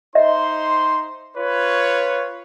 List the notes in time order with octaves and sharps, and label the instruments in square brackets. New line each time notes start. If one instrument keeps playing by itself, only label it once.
[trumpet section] D#4 C5 C6 [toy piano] D#5 E5
[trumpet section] F4 B4 C#5